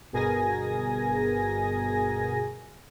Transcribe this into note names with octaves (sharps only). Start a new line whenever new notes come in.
G1 B2 G#4 A#4 G#5 A#6